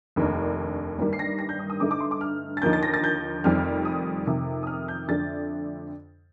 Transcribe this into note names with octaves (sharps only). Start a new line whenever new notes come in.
F1 D#2 D#3 A#3 D4
G1 G2 D#3 G3 A#3
C7
A#6
A#6
G6
D#6
D#6
G2 D3 A3 D#4 D6
D6
C6
D6
F6
A6
D#2 D3 F3 A#3 D#4 G6
A6
A#6
A6
G6
F1 F2 D#3 G3 C4 F6
D#6
F2 C3 D#3
D#6
F6
G6
F2 D3 A3 D4 A6